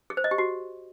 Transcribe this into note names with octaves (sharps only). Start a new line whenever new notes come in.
G#4
C5
D#5
G4
F#4